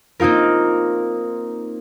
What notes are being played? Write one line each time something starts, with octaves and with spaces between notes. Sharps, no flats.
A#3 C4 D#4 F4 A#4